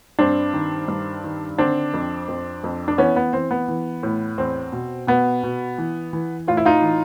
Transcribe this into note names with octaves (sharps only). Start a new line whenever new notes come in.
G2 C4 D4
D#3
G2
D#3
D3 C4 D4
F2
F2
F2
D4
E3 B3 C#4
B3
E3 C4
B3
E3
A2
E2 C4
B2
B2 B3
B2
E3
E3
A2 F4
E4
D#4 F4
E3